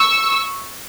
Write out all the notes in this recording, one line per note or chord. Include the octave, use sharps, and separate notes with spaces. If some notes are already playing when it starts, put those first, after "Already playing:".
Already playing: C#6 E6